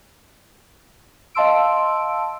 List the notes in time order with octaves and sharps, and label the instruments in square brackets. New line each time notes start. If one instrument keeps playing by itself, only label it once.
[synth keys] D#5 F5 A5 C6 E6 D7